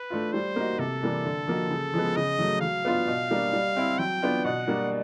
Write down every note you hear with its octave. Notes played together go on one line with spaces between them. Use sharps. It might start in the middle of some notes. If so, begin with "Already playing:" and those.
Already playing: B4
A3 D4 F4
G3 C5
A#3 D#4 F#4
C3 A4
E3 G3 A#3
D3
F3 A#3 D#4 F#4
C#3
F3 G#3 B3
C#3 D#5
F#3 A3
F#3 F5
B3 D4 F4
B2
G3 A#3 D4
G3
C4 E4
F#3 G5
B3 D4 F4
B2 F#5
G3 A#3 D4